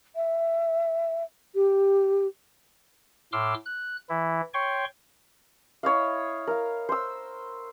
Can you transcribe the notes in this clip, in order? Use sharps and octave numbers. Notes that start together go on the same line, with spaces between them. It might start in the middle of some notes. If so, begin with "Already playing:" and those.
E5
G4
A2 C6 D6 E6 F6
F#6
E3 E4
C#5 G5 C6 C#6
E4 C#5 D#5 F5
A#4 F5
C5 E6